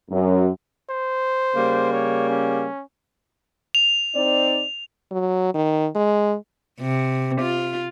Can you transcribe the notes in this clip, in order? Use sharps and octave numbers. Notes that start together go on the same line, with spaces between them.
F#2
C5
C#3 G3 A#3
C#5
C#4
F7
C4 D#4 D5
F#3
D#3
G#3
C3
F4